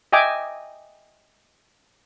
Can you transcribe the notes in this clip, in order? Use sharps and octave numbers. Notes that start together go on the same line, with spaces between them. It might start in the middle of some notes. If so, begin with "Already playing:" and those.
D#5 E5 G5 G#5 D6